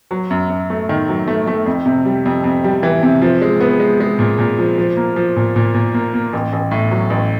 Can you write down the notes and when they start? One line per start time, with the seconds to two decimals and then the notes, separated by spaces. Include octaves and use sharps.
0.11 F#3
0.30 F#2
0.50 F#2
0.70 A3
0.89 D#3
1.09 F#3
1.28 A3
1.47 A3
1.66 F2
1.86 C3
2.05 G3
2.25 F2
2.44 F2
2.64 G3
2.83 E3
3.03 C3
3.22 F3
3.42 G#3
3.60 B3
3.80 G#3
4.00 G#3
4.19 A#2
4.39 A#2
4.59 F3
4.78 F3
4.97 A#3
5.16 F3
5.36 A#2
5.56 A#2
5.74 A#2
5.94 A#3
6.13 A#3
6.33 A1
6.53 A1
6.71 A2
6.91 F#3
7.10 A1